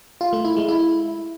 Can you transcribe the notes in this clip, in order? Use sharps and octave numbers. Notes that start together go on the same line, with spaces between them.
F4
A3
E4
G#3
E4